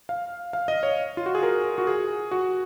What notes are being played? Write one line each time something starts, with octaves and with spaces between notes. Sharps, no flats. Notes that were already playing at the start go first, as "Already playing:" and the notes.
F5
F5
D#5
C#5
F4
F#4
G#4
A#4
F#4
G#4
F#4